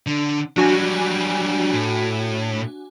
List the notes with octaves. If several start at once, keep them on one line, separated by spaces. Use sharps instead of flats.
D3
F#3 G3 D4 F#4 G#5
A2